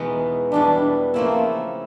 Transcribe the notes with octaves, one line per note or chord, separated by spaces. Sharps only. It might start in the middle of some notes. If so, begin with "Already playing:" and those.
Already playing: E2 B2 G#3 B3 D#4
E2 B2 G3 D4
C#3 F3 A3 A#3 C4 E4